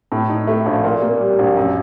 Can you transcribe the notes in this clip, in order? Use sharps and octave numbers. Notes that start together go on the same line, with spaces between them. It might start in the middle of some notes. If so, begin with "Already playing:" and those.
A2
D#4
A3
A#1
A#2
A#3
G3
A#1
F#2